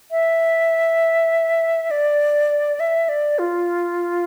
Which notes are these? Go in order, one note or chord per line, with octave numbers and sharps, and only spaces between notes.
E5
D5
E5
D5
F4